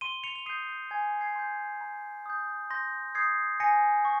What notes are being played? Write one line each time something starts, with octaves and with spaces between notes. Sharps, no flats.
C6 D#7 G7
C#7 F7
F7
D#6 G6 C7 D#7
G6
G#5 G#6
G#6 C7
C6 G6
G#6
A#5
D#6 G6
C6 G6 A#6
D#6 G6 G#6 C7
G#5 A#6 C#7
C#6